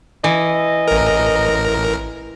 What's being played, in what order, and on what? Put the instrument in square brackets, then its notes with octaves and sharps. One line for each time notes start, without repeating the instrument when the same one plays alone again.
[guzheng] E3 [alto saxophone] D#5
[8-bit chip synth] A1 A#4